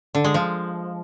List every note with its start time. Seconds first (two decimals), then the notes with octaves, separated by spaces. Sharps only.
0.15 D3
0.24 G#3
0.34 F3